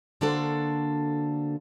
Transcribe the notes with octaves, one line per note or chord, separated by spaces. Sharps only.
D3 A#3 D4 F#4 A4 C5